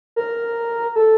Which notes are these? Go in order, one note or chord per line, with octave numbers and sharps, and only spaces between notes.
A#4
A4